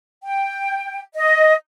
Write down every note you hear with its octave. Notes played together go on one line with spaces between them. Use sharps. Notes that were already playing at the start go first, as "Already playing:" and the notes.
G5
D#5